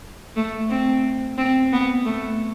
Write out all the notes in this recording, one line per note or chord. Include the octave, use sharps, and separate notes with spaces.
A3
C4
C4
B3
A3